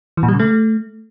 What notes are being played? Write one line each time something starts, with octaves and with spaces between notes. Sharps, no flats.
E3
A#2
G3
C#3
A3